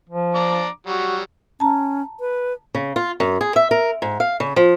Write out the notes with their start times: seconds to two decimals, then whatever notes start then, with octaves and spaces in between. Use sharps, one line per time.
0.09 F3
0.35 D4 A#5 D6
0.87 F#3 G3 F#4
1.60 C#4 A5 A#5
2.20 B4
2.75 C#3
2.96 F4
3.20 F#2
3.41 G#4
3.56 E5
3.71 A#4
4.02 G#2
4.20 F5
4.40 C#3
4.56 F3